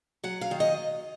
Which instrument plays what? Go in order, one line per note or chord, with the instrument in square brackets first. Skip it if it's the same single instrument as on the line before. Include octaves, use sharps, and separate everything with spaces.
[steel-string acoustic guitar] F#3 F#5
F5
D#3
D#5